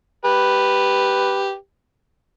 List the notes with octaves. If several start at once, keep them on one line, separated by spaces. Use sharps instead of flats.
G4 B4